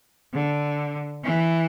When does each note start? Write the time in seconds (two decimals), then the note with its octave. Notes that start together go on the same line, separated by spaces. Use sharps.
0.33 D3
1.22 E3